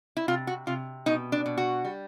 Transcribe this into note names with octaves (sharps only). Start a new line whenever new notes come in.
E4
C3 F4
F#4
C3 F4
B2 D#4
D4
B2
F#4
G3